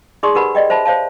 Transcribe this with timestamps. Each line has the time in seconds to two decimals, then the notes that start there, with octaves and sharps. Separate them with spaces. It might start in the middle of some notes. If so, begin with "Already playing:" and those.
0.23 D#4 G#4 D5 C6 C#6 D#6
0.35 D#4 G4 A#4 B4 F#5 B5
0.55 D5 D#5 G5
0.70 C5 E5 A5 B5
0.85 C5 C#5 F5 A5